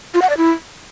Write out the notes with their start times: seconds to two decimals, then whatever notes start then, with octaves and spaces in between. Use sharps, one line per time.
0.14 F4
0.22 F#5
0.30 D5
0.37 E4